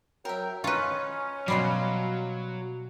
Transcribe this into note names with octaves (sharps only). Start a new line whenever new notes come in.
F#3 A#4 E5 G5
C#4 D#4 F4 B4 C#5
B2 F#3 G3 F5 B5 C6